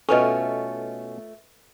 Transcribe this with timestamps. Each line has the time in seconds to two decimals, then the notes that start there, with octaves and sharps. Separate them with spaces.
0.09 B2 A3 C#4 F4 A4 B4 C#5 D#5